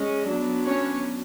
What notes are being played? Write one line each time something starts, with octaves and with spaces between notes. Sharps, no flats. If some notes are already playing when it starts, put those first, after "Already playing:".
Already playing: G#3 C#4
F#3 B3 D4
C#4 C#5